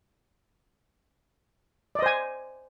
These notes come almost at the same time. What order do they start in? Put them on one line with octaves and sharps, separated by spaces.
D5 D#5 C5 G#5